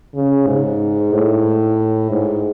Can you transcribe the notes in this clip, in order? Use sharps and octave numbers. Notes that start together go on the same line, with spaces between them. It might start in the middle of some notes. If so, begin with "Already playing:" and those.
C#3
G#2
A2
G#2